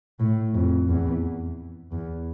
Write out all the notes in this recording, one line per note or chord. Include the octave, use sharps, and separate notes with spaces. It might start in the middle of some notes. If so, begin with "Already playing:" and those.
A2
F2
E2
E2